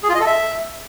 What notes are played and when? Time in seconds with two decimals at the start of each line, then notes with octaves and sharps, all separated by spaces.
0.03 G#4
0.09 F4
0.15 D#5
0.20 A4
0.26 E5